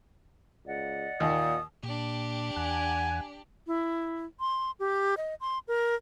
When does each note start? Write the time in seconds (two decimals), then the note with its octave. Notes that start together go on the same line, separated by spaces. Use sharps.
0.66 C#2 D5 D#5 F#5
1.20 D#2 A#2 D#6
1.83 A#2 D4 G4
2.56 E2 F#5 G#5
3.67 E4
4.40 C6
4.80 G4
5.17 D#5
5.41 C6
5.68 A#4